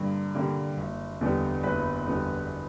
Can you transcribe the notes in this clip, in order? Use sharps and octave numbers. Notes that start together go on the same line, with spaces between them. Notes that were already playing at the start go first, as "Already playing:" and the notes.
Already playing: G2 D3 A#3
D3 G3 A#3
F#1
E2 D3 G3 B3
F#1 B4 B5
E2 D3 G3 B3